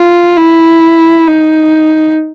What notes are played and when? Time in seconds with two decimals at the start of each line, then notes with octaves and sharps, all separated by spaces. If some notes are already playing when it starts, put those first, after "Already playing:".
Already playing: F4
0.37 E4
1.27 D#4